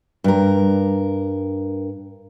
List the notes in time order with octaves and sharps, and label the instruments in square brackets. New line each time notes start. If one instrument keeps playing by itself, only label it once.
[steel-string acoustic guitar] G2 A#4